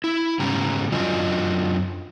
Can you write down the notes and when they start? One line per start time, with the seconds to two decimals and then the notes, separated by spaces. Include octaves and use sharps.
0.04 E4
0.39 G#2 C#3 G3 C#4 G4 A#5
0.92 F#2 D4 F4 F#4 D#5 G#5